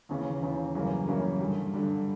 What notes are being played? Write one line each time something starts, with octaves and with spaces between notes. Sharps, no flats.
D#2 C#3 E3
D#2 C#3 E3
F#2 C#3 E3 G3 A#3
F#2 C#3 E3 G3 A#3
G2 D3 G3
G2 D3 G3